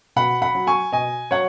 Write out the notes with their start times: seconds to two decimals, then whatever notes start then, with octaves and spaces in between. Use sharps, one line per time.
0.16 B2 F#5 B5
0.42 F#5 B5
0.55 F#3
0.67 G#5 C#6
0.92 B2 D#5 G#5
1.31 F#3 C#5 F#5